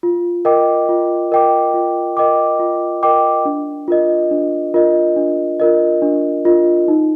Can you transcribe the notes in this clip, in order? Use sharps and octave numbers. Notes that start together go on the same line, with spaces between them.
F4
A#4 D#5 G5 D6
F4
A#4 D#5 G5 D6
F4
A#4 D#5 G5 D6
F4
A#4 D#5 G5 D6
D4
F4 A#4 D#5
D4
F4 A#4 D#5
D4
F4 A#4 D#5
D4
F4 A#4 D#5
D#4